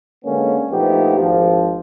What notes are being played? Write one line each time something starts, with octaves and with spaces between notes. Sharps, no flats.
D3 G#3 A#3 B3 C#4
A#1 F3 A3 B3 D#4 G4
G#1 F3